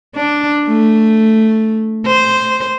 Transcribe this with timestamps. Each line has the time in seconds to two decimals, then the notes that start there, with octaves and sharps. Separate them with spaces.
0.15 D4
0.67 A3
2.06 C5